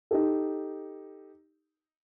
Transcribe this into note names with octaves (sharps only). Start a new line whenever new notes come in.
D#4 G4 A4